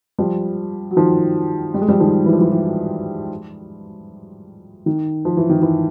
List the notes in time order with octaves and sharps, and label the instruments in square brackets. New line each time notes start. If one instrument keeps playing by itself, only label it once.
[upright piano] F3 G3
F#3
D#3 F3
G3
G#3
F3 G3
D#3 F3
E3
F3
E3
E3
D#3
F3
E3
D#3
E3